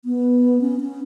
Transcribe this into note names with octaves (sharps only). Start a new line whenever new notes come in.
B3
C#4
C#4